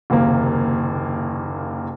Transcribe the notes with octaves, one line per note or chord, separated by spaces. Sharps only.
F#1 D#2 C3 A#3